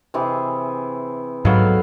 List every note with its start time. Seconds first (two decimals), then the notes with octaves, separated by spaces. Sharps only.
0.14 C3 E3 G#4
1.45 G#2 F#3 B3 A4 F5